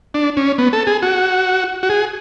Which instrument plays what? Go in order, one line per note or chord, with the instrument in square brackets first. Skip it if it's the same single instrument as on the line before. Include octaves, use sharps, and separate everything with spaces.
[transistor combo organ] D4
C#4
B3
A4
G#4
F#4
F#4
G#4